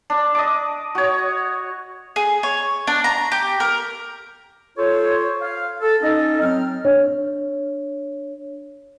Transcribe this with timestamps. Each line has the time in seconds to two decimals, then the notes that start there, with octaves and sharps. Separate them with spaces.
0.10 D4
0.35 D#5 D6
0.95 F#4 C#5
2.16 G#4
2.43 C#5
2.87 D4
3.04 A#5
3.32 G4
3.60 A#4
4.77 F4 A4 C5 C#5
5.41 F5
5.81 A4
6.02 C#4 D#4 A4 D#5
6.41 F#3 C4 F6
6.85 D4 C#5